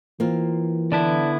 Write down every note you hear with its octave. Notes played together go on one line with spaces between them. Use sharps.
E3 A#3 C4 F4
D3 B3 E4 D5 A5